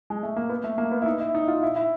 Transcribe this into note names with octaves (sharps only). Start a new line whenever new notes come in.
G#3
A3
A#3
B3
A3
A#3
B3
E4
D#4
E4
D#4
F4
E4
E4